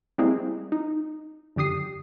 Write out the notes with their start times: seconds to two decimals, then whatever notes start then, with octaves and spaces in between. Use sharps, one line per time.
0.18 G3 G#3 A#3 C4 E4 G#4
0.72 D#4
1.56 F#2 D3 G4 D#6 C7